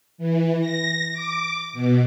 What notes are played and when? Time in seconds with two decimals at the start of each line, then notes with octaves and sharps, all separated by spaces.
0.18 E3
0.61 A#6
1.12 D6
1.73 B2